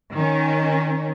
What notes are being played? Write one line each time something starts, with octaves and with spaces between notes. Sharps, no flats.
D#3 C#4